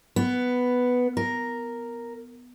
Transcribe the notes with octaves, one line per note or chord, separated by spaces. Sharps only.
B3
A#4